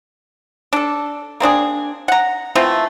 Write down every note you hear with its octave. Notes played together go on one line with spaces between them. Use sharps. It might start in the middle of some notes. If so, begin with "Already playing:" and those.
D4 A4
A#3 C4 D4 G#4
F#5 A#5
E3 A3 C4 F4